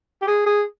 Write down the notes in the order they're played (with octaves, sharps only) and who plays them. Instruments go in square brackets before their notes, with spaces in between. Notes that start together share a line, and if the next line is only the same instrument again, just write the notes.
[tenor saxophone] G4
G#4
G#4